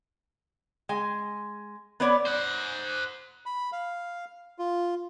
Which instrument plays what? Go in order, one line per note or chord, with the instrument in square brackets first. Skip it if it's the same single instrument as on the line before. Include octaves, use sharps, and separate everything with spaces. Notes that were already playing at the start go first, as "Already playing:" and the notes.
[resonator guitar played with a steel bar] G#3 G#5
B3 B4 C#5 D5
[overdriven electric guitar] C5 F#5
[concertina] B5
F5
F4